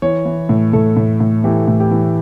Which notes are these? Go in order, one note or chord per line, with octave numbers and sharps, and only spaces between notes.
E3 C#5
E3
A2
A2 A4
A2
A2
E3 G4
A2
G4
E3